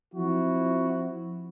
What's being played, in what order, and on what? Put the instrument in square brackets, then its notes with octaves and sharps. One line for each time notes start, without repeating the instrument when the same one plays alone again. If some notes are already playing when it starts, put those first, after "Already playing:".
[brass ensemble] F3 C4 E4 F#4